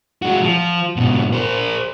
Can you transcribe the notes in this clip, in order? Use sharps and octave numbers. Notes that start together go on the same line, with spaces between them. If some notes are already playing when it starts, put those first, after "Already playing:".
G#3 F#4
F3
G#2 B2
A#4 C5